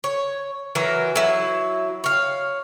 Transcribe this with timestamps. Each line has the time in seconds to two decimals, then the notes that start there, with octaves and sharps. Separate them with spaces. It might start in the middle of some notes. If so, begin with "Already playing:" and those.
0.04 C#5
0.75 E3 F#3 A#4
1.16 F#3 E4
2.04 C#5 F5